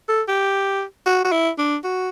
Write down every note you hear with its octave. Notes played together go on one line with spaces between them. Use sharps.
A4
G4
F#4
F#4
E4
D4
F#4